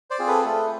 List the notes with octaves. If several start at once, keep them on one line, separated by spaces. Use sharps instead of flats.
C5 D5
C4 F4 G#4
A4 B4
A3 A4